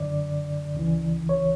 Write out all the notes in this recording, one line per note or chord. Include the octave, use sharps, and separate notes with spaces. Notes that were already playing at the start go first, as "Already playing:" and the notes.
Already playing: F#2 D3 D5
C#2 C#3 E3
C#5